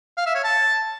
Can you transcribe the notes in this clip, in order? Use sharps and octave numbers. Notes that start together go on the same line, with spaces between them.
F5
E5
C#5
A5